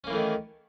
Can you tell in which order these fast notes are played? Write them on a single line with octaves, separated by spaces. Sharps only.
C#4 A#3 E3 A3 D#3